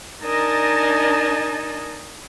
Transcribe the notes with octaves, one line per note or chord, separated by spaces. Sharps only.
D4 D#4 A#4 D#5 G#5 A5